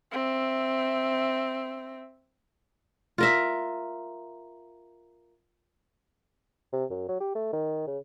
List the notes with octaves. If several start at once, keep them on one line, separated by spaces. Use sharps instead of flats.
C4 E5
F4 A#4 E5
C3
F#2
F#3
G4
A3
D#3
C#3